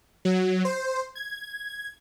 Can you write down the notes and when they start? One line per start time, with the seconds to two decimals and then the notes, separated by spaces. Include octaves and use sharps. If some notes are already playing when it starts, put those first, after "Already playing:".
0.25 F#3
0.65 C5
1.15 G#6